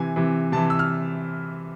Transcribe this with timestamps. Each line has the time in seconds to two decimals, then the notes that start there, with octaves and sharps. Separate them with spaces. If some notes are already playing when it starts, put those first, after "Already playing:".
Already playing: C3 E3 G#5
0.16 C3 E3
0.52 C3 A5
0.56 E3
0.70 E6
0.79 F6